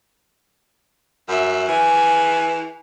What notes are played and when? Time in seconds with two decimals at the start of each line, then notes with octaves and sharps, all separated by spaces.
1.29 F#2 E5
1.68 E3 G#5